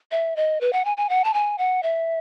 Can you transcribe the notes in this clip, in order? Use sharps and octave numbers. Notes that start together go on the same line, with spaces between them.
E5
D#5
B4
F#5
G#5
G#5
F#5
A5
G#5
F#5
E5